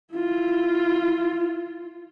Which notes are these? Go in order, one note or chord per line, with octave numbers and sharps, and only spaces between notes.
E4 F4